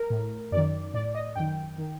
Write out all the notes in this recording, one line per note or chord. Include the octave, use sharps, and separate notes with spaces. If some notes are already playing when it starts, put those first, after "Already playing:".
Already playing: A#4
A2
F#2 D#3 D5
A2 D5
D#5
F#2 D#3 G5
D#3